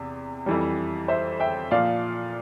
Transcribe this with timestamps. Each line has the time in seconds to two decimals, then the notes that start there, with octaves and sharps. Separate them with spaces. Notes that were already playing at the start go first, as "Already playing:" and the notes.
Already playing: E2 C3
0.46 F2 E3 G3
1.08 C5 E5
1.40 E5 G5
1.71 A#2 F3 D5 F5